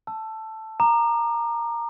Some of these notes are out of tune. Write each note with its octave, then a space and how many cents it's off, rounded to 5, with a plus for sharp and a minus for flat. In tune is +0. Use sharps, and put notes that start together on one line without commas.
A5 +0 E6 +15
A#5 +0 D6 +40